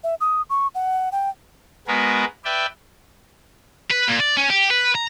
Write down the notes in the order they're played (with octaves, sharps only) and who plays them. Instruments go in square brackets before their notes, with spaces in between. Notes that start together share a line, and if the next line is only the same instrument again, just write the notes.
[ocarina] E5
D#6
C#6
F#5
G5
[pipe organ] G#3 B3 F#4 G#4 A#4 B4
B4 D5 E5 G5
[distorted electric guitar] B4
A#2
D5
C#4
G4
B4
A#5